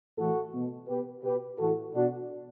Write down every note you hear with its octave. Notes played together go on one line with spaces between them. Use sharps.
A2 E3 F#4 A4
B2
B2 G4 B4
B2 G4 B4
A2 E3 F#4 A4
B2 D4 F#4